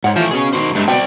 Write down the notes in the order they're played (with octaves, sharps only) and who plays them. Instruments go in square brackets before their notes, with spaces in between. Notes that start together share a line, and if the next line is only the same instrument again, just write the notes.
[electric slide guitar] G#2 [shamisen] C#5 F#5
[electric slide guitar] E3 A3 [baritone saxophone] F3
[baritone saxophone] B2 [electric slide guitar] C#4 G#4
[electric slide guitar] D#3 F#4 C5
[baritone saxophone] G2 [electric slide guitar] F#3 G#3 A3
[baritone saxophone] B2 [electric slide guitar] C4 C5 D5 [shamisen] G5 A5